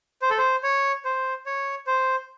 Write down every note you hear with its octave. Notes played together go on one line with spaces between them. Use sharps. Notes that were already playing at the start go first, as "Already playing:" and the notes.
C5
A4
C5
C#5
C5
C#5
C5